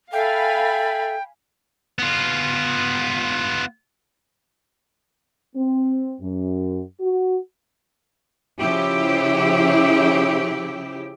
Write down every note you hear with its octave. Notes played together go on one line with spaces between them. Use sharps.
A4 E5 F5 G5 G#5 B5
B3 F4
C4
F#2
F#4
C#3 F3 E4 G4